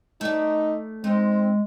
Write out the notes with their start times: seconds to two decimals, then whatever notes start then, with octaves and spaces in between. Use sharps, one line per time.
0.21 A3 D#4 D5
1.04 G#3 C4 D#4